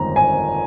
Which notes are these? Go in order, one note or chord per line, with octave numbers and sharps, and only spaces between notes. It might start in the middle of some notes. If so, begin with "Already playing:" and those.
Already playing: G1 F2 D#3 G#3 A#5
G#5